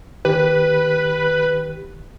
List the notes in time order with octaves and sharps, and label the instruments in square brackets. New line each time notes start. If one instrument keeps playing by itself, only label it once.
[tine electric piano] D#3 G4 [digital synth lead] B4